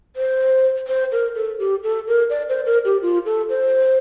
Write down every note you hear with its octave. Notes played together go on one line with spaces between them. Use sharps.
C5
C5
A#4
A4
G4
A4
A#4
D5
C5
A#4
G4
F4
A4
C5